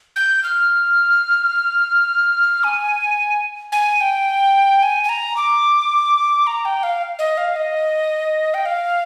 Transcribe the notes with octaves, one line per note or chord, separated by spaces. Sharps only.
G6
F6
G#5
G#5
G5
G#5
G#5
A#5
D6
A#5
G5
F5
D#5
F5
D#5
G5
F5